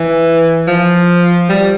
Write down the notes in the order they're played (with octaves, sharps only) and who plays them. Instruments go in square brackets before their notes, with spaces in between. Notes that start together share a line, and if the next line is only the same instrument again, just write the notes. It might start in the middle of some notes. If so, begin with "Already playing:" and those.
Already playing: [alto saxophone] E3
F3
G3